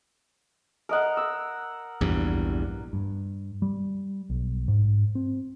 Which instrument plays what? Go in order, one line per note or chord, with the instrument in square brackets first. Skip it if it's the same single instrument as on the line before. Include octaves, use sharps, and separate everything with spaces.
[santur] A#4 D#5 F#5
E6
[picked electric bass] A#1 E2 G2
G2
G3
B1
G#2
C4